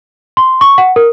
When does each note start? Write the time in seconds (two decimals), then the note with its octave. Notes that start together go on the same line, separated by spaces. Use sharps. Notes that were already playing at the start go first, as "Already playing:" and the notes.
0.37 C6
0.61 C#6
0.78 F#5
0.96 A#4